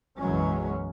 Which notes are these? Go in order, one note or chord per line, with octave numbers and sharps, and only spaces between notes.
B1 F#2 E3 F#3 G#3 C#4